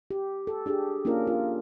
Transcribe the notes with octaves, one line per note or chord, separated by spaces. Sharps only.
G4
A4
D4 G4 G#4
A#3 C#4 D4 F4 A#4
F4